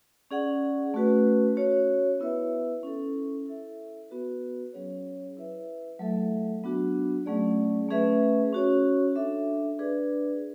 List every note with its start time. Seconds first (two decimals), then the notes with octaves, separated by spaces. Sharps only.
0.31 C#4 G#4 D5 F#5
0.94 A3 C#4 F#4 B4
1.57 C#4 F#4 C#5
2.20 B3 E4 B4 E5
2.83 C#4 E4 A4
3.46 E4 A4 E5
4.10 B3 F#4 B4
4.73 F#3 C#4 G#4 C#5
5.37 E4 B4 E5
5.99 F#3 A3 E4 A4 E5
6.63 F#3 B3 D4 F#4
7.26 F#3 A3 C#4 G#4 D5
7.89 A3 C#4 G#4 B4 E5
8.53 C#4 F#4 C#5
9.16 D4 A4 E5
9.79 D4 G#4 B4 D5